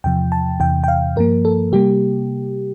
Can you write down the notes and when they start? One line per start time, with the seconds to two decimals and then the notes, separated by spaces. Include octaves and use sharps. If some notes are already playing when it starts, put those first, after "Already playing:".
0.04 E2 C3 F3 G5
0.32 A5
0.60 E2 C3 E3 G5
0.84 G5
0.88 F5
1.16 G2 F3 A#3 A#4
1.45 A4
1.72 C3 G3 A#3 G4